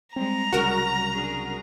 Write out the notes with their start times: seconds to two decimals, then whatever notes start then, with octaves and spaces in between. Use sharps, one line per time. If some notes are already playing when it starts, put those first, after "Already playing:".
0.16 G3 G#3 C4 A#5
0.53 C2 C#3 F#3 G3 F#4 A#4
1.13 D4 G#4